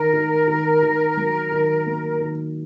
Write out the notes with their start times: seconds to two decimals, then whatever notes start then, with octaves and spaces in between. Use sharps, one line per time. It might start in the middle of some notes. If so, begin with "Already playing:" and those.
Already playing: D#3 A#4
0.13 D#3
0.48 D#3
0.83 D#3
1.17 F#3
1.52 D#3
1.86 A#3
2.21 D#3